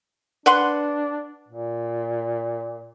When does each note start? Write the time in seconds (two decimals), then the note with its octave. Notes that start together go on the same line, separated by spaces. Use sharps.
0.46 D4 B4 F#5 C6
1.48 A#2